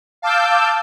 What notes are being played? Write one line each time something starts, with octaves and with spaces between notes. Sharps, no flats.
F5 A5 D6 E6 G6